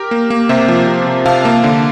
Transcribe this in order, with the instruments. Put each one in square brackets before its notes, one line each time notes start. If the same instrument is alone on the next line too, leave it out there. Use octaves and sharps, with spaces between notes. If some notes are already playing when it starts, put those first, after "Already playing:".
Already playing: [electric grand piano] G4 A#4
A#3
A#3
C3 C5 E5
F3
C3
C3
C3 F5 A5
A#3
D3